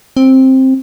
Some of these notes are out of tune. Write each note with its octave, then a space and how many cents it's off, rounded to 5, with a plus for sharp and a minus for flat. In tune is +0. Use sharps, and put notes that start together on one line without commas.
C4 +10